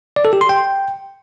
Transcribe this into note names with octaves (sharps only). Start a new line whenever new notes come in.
D5
A4
G4
C6
G5